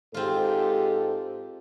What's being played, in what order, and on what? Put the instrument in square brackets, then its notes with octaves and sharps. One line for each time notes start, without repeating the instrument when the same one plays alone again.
[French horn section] G#2 G4 A4 [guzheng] C4 F4